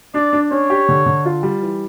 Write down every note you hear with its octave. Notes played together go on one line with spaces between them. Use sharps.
D4 D5
D4
C#4 C#5
G4
D3
D3
F4
G3
E3